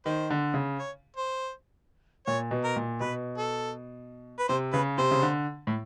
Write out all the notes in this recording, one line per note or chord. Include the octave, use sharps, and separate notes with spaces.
D#3 C5
D3
C#3
C#5
C5
A#2 C#5
B2
A#4
A#2
B2 B4
A4
B4
C3 C5
C#3 B4
C3 C5
C#3
D3
A2